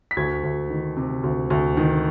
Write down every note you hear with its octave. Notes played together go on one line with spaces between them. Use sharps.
B6
D2 G#6
D2
D#3
C3
D2
D2
D#3